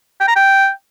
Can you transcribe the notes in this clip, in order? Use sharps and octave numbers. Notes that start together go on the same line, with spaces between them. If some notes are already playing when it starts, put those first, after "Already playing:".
G5
A#5
G5